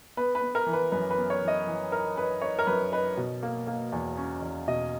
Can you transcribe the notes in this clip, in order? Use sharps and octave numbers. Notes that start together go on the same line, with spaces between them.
B3 B4
B4
B3
A#4
E3
B4
F#2 B4
B4
B3
C#5
E3
D#5
E3
D#4 A#4
D#4 B4
D#4 C#5
A#4
F#2 B4
D#4 B4
B2
A#3
A#3
E2
C#4
E2
B2 D#5